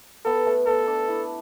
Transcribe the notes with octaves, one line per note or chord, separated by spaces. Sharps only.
B3 A4
A3
B3 A4
D4
E4